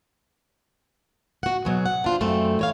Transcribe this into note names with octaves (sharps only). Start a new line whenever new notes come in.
F#4 F#5
B2 F#3 G#4
F#5
D4 F4 C5
F#2 A3 C4
E3 C#5 F5